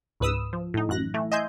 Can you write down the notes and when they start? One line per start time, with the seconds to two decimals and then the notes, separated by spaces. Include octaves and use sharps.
0.20 C#2 G#2 B4 D#6 E6
0.53 F3
0.74 A2 D#4
0.89 A1 F#2 F#6 A#6
1.14 E3 A3
1.32 D#5 E5 G#5 C6 G6